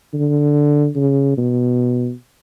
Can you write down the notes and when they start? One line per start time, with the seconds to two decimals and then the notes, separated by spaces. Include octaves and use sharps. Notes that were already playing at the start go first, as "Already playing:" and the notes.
0.14 D3
0.96 C#3
1.38 B2